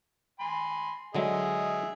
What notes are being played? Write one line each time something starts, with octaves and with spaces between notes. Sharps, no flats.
G#5 B5 C6
D3 F#3 G#3 G#4 D#5 E5